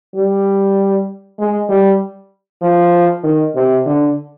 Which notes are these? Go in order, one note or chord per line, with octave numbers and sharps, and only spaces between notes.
G3
G#3
G3
F3
D#3
C3
D3